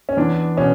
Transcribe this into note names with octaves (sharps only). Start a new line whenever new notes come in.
C#4
E2 D4
B2 C#4